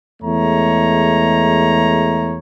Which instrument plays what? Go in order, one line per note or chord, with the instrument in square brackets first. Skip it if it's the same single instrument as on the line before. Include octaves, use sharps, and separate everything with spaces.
[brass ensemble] E2 G#3 A3 C#5 A#5